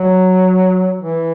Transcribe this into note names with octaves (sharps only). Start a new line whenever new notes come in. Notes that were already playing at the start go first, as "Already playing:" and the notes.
Already playing: F#3
E3